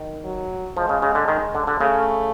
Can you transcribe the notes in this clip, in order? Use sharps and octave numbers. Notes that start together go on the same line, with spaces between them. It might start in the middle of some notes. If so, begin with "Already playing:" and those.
Already playing: D#3
F#3
F3 G#3
C#3
C#3
D3
D#3
D3
D3
C#3 A3